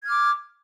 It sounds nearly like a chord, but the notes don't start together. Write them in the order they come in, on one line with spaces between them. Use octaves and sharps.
G#6 F6 D6